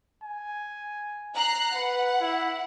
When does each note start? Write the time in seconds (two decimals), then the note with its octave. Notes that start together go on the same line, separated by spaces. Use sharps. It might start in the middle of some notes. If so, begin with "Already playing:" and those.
0.24 G#5
1.35 A#5 F#6 C7
1.75 B4 F#5
2.21 E4